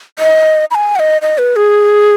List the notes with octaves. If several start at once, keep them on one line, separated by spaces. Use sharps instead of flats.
D#5
B5
G#5
F#5
D#5
D#5
B4
G#4